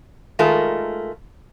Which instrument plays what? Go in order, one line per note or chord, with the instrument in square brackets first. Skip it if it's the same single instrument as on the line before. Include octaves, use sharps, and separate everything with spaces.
[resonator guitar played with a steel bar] D#3 G#3 A3 F4 A#4